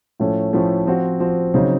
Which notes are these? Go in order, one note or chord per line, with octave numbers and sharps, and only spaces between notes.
A2 F3 A3 C#4
A2 F3 A3 C#4
F3 C4 F#4
F3 C4 F#4
C#3 F#3 C4 D#4